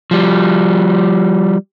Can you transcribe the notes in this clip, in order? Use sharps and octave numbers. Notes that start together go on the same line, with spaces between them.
F3 G3